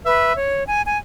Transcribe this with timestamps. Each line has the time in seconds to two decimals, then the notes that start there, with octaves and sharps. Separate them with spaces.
0.05 B4 E5
0.36 C#5
0.67 G#5
0.86 G#5